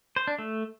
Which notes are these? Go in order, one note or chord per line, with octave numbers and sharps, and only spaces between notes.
C5
D4
A3